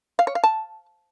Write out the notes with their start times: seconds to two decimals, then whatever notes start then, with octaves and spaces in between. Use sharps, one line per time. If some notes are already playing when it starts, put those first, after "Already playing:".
0.19 F5
0.27 C#5
0.35 F5
0.44 A5